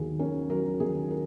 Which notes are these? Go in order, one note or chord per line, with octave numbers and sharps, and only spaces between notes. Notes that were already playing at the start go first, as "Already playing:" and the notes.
Already playing: D#2 D#3 F#3 G#4
C#4 A#4
F#3 A#4
D#3 G#4
A#4